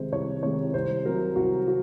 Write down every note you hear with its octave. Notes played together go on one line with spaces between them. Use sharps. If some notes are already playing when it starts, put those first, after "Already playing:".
Already playing: C2 C3 D#3 G#3 C5
C2 C#5
C3 D#3 G#3 C#5
C2 C5
C3 F#3 A#4
C2 F#4
F#4